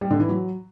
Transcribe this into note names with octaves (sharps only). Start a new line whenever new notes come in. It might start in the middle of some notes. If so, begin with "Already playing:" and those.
G3
D3
E3
F#3